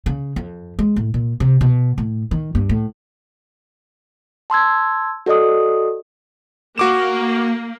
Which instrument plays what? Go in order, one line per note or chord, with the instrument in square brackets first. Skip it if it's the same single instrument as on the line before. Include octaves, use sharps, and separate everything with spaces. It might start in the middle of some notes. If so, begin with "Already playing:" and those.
[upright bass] C#3
F2
G#3
A2
A#2
C3
B2
A2
D#3
G2
A2
[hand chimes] A5 C6 E6 G#6
F#4 A4 D5 D#5 D#6
[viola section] A#3 [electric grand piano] F#4 D6 E7